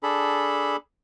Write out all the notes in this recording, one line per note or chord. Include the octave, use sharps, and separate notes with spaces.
D4 G#4 A4 B5